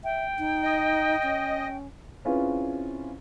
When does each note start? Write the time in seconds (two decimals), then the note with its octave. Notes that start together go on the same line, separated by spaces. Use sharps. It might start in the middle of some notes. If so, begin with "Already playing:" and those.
0.04 E5 G5
0.39 D#4
0.63 D#5
1.23 C#4
2.25 C4 C#4 E4 F4 G#4 B4